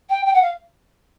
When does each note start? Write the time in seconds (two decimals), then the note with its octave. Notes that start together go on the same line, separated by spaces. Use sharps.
0.09 G5
0.25 G5
0.34 F#5
0.42 F5